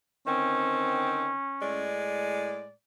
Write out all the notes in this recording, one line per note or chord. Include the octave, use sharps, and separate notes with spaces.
D3 D#3 C4 C#4
A2 G#3 D5